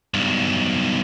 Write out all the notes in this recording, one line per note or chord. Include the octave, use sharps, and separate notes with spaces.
B1 G2